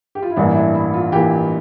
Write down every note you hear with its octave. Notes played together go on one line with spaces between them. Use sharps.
G4
F4
E4
A1 G2 E3 A#3 D4
E4
D4
E4
F4
E3 A#3 G4